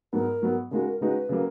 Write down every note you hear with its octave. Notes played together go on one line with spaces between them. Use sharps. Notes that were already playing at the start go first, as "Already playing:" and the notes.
G#2 F#3 B3 A#4
G#2 F#3 B3
C#3 G#3 D#4 F#4 A#4
A#4
C#3 G#3 D#4 F#4 B4
C#3 F#3 A#3